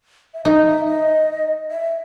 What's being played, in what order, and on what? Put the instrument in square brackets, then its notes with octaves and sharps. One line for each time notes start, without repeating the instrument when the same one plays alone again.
[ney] E5
[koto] D#4 [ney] D#5
[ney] E5
D#5
E5